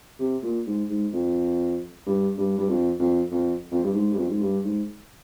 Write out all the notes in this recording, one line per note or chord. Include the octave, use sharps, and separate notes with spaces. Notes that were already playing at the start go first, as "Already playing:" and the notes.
C3
A#2
G#2
G#2
F2
G2
G2
G2
F2
F2
F2
F2
G2
G#2
G2
F2
G#2
G2
G#2